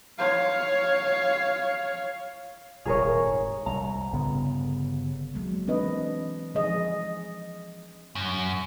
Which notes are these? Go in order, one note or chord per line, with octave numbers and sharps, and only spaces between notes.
C#5 F5
D#1 D#2 C3 G#4 A#4 C#5
G#2
C2 A#5
G1 C#3 B3
F#3 G#3 A#3
E3 C4 D4 B4 D#5
F3 G#3 G#4 D#5
F#2